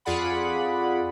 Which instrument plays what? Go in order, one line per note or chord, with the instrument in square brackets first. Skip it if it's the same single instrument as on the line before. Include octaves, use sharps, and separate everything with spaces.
[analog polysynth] F2 F4 G#4 D5 F#5 B5